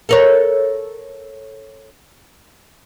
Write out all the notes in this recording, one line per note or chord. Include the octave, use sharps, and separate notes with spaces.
A4 A#4 C#5